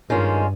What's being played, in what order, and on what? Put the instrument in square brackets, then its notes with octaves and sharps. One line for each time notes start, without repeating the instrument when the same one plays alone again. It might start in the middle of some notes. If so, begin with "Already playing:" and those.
[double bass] G2 [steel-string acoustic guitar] D#3 G#3 C#4 F4